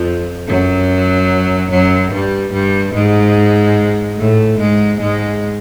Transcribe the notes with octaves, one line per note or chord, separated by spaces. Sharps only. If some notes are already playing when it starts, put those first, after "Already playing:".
Already playing: F2 F3
F#2 F#3
F#2 F#3
G2 G3
G2 G3
G#2 G#3
A2 A3
G#2 G#3
G#2 G#3